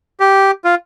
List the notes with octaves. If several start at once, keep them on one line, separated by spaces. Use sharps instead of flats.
G4
F4